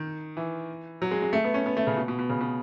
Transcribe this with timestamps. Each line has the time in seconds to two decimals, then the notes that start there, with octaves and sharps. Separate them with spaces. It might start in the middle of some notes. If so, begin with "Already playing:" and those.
Already playing: D#3
0.37 E3
1.02 F#3
1.11 G#3
1.22 G#3
1.33 A3
1.44 B3
1.54 C#4
1.66 B3
1.77 A3
1.87 C#3
1.97 B2
2.08 B2
2.19 B2
2.29 C#3
2.41 B2